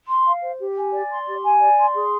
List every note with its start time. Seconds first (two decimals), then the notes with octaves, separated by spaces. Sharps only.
0.08 C6
0.26 F5
0.42 C5
0.59 G4
0.77 G#5
0.93 D5
1.10 C6
1.27 G4
1.44 G#5
1.60 D5
1.77 C6
1.95 G#4